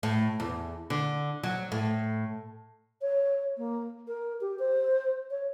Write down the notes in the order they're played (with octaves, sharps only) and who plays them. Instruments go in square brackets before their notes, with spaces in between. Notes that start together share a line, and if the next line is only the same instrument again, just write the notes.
[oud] A2
E2
D3
F#3
A2
[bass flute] C#5
A#3
A#4
G4
C5
C#5